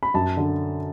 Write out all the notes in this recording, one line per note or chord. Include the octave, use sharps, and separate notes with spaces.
B5
F#2 A5
D3